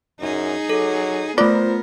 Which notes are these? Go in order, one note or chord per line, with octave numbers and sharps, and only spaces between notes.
F#2 D#4 G#4
F#3 A4
A3 B3 F4 A#4 C5 D5